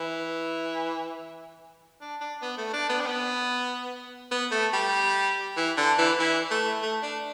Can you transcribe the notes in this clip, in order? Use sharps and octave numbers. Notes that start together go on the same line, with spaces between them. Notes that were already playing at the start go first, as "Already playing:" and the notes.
Already playing: E3
D4
D4
B3
A3
D4
B3
D4
B3
B3
A3
G3
E3
D3
E3
E3
A3
A3
D4